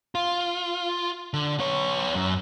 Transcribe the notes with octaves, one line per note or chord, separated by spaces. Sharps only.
F4
D3
B3 C#5
F#2